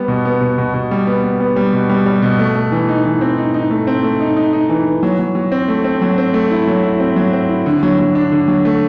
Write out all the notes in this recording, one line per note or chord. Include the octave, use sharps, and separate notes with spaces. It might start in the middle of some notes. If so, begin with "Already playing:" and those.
Already playing: G3 B3
B2
B3
B2
B2
B2
G3
B3
B3
B3
G3
B2
G3
G3
B2
A3
A3
E3
D#4
E3
C4
D#4
D#4
A3
C4
A3
D#4
D#4
D#4
E3
E3
F#3
F#3
F#3
C4
A3
C4
F#3
C4
A3
E4
F#3
E4
C4
F#3
C4
E4
D3
F#3
F#3
D4
D3
F#3
A3